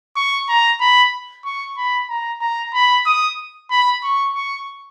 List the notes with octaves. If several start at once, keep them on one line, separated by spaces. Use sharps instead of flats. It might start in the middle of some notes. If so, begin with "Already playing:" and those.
C#6
A#5
B5
C#6
B5
A#5
A#5
B5
D#6
B5
C#6
C#6